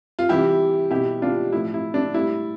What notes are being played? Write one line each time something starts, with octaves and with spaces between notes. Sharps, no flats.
F4
C3 E3 G3 E4 G4
B2 G3 E4 G4
D4 F4
A2 F3 E4
E4
D4
A2 G3 E4